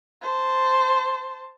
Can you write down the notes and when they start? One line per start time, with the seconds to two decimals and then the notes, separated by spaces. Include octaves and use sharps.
0.21 C5 A5